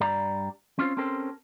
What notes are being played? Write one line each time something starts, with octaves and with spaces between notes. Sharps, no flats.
G2 G3 D5 A#5
C4 C#4 F4 C5
C4 C#4 G4 A4 A#4 C5